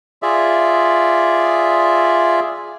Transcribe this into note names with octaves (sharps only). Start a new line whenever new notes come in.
F4 G#4 D5 E5